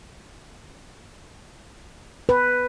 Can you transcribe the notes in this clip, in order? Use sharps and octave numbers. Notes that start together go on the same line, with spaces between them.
B4